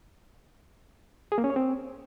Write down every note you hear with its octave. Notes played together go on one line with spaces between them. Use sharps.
G#4
A#3
C#4
C#5
C4